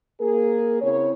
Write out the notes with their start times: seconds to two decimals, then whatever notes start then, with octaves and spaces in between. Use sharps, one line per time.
0.21 A#3 G#4 A#4
0.81 C#3 C4 E4 C#5